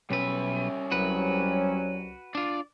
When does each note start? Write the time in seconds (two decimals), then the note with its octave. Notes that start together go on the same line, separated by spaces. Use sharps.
0.11 B1 G3 C#4 B4 E5
0.91 C2 F#3 F#4 B4
2.35 D4 F4 D5